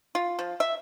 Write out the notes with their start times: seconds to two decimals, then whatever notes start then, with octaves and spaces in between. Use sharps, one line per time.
0.15 F4
0.39 F3
0.60 E5